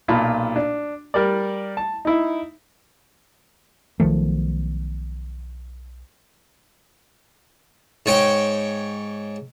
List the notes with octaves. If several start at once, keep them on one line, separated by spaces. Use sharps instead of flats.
B1 A#2 F4 A5 B5
D4
G3 A#4 D5
A5
D#4 E4
B1 D#3 F3 A3
G#2 C#5 G5